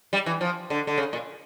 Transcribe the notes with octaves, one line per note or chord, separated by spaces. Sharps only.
G3
E3
F3
D3
D3
C#3
A#2